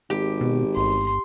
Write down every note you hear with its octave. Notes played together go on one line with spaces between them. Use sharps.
G#1 G4
B2
G1 C6